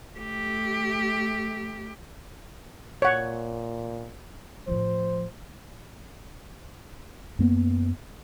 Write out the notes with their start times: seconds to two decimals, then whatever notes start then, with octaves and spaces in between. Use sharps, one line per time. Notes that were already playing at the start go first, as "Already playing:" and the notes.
0.17 A3 G4
3.02 A#2 C#5 F#5
4.68 A2 F3 C5
7.39 F#2 A#3 B3